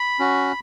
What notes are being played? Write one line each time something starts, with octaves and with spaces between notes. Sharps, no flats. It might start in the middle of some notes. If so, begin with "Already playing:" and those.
Already playing: B5
C#4 F#4